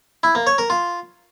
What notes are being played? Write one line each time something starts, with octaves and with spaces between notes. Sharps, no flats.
E4
A#3
C#5
A#4
F4